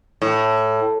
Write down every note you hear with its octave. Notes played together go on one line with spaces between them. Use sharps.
A2